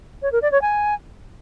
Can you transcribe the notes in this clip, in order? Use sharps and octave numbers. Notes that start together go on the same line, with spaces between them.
C#5
A#4
D5
C#5
G#5